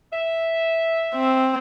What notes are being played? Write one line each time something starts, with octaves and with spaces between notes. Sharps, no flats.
E5
C4